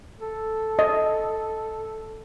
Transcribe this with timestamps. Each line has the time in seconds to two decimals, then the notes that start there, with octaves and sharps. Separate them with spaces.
0.19 A4
0.79 D#5